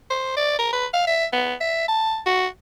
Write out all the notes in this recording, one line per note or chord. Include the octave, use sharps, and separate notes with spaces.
C5
D5
A#4
B4
F5
E5
B3
E5
A5
F#4